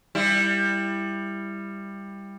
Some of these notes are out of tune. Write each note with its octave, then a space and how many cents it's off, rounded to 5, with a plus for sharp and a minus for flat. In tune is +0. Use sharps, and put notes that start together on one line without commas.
G3 +15 E4 +10